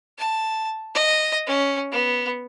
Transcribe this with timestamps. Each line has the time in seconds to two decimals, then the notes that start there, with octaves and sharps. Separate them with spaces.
0.18 A5
0.95 D#5
1.47 C#4
1.92 B3